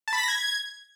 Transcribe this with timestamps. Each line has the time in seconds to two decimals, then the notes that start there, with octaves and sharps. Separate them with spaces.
0.08 A5
0.13 B5
0.18 B6
0.23 A#6
0.28 G#6